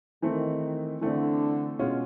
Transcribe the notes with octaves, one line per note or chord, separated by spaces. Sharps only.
D#3 E3 A3 C4
D3 E3 A3 C4
B2 G#3 C#4 F4